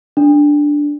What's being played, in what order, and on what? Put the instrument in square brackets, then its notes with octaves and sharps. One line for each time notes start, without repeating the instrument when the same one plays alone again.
[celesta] D4